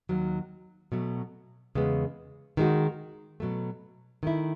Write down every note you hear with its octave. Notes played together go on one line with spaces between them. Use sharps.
D#2 D#3 F#3
B2 F#3 A3
E2 C#3 G#3 B3
D#3 G#3 D#4 F#4
B2 F#3 A3
D#3 A3 E4